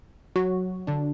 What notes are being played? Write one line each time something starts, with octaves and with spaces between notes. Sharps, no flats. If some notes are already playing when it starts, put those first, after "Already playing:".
F#3 F#4
D3 D4